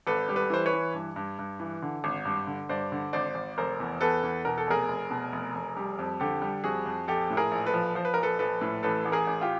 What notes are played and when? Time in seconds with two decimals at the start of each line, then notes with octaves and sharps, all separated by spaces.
0.07 G#1 A4 B4
0.29 G3
0.36 A4 B4
0.50 E3 C5
0.66 B4 C#5
0.73 E3
0.94 G2
1.16 G2
1.39 G2
1.60 E3
1.82 D3
2.04 G#1
2.25 G2
2.47 D3
2.69 G2 C5 D5
2.92 D3
3.13 G#1 C5 D5
3.35 G#1
3.58 F1 A#4 C5
3.80 E2
4.01 E2 A4 B4
4.23 E2
4.45 B2 A#4
4.58 A4
4.67 F1 G#4 A#4
4.88 F1
5.10 B2
5.32 F1
5.55 F1
5.77 G3
5.99 F2
6.20 D3 G4 A4
6.42 G3
6.64 F2 F#4 G#4
6.86 F2
7.08 A#1 G4 A4
7.30 A2
7.37 G#4 A#4
7.51 A#1
7.66 A4 B4
7.74 F3
7.95 F3 C5
8.05 B4
8.14 A#1 A#4
8.23 A4 B4
8.39 A#1 A4 B4
8.61 A2
8.83 A1 A4 B4
9.05 A1
9.12 G#4 A#4
9.27 A1
9.41 F4 G4